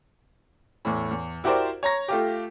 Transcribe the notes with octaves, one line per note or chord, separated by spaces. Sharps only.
E2 A2
E2
E4 F#4 G4 A#4 C5 D5
C#5 A#5 C#6 A#6
A3 F4 G4